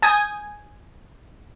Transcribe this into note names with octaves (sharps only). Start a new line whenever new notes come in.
G#5 D#6 G6 G#6